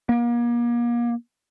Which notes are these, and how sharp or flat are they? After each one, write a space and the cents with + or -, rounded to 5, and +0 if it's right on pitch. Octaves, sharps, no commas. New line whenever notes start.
A#3 +35